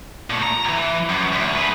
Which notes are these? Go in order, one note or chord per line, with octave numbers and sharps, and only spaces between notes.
A#2 A3
A#5
E3
F#2
D2
G#4 B4